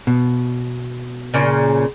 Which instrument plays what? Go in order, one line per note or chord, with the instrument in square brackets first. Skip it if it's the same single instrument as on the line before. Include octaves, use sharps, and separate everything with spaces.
[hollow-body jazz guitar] B2
[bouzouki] A#2 C#3